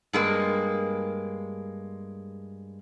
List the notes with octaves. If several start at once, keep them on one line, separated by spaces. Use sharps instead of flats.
G2 G#3 A#3